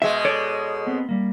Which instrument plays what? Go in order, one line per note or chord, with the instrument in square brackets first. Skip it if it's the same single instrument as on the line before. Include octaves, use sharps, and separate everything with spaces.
[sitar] B2 G#3 [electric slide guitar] D#5 [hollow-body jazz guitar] E5
[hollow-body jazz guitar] A4 C#5 D5
[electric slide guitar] B3 C4
G3 A#3